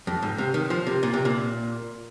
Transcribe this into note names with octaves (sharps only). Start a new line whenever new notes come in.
F2
G#2
C3
D#3
F3
C3
A#2
C3
A#2